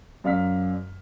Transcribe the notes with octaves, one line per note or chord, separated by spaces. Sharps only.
F#2 D5 F5 F6 B6